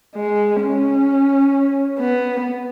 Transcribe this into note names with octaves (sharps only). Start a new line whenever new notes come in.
G#3
C#4
B3